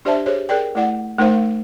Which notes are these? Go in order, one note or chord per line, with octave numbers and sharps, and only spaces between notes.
D4 G4 C5 D5 E5 A5
G4 G#4 C5 C#5
G#4 A#4 D5 G5
A3 E4 D5 F#5
A3 D#4 A#4 C5 F5